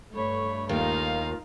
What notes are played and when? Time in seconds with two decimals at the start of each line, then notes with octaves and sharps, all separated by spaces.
0.15 G2 A3 C#5 B5 C#6
0.69 D#2 D#4 F4 A#4 F5